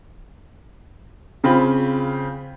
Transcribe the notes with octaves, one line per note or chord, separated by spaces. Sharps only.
C#3 C4 F4 B5